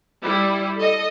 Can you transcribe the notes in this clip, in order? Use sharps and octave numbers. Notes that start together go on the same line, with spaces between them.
G3 E4
A4 D#5